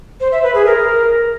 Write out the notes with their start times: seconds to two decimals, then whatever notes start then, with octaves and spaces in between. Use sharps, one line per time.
0.20 C5
0.32 E5
0.43 B4
0.55 G#4
0.66 A#4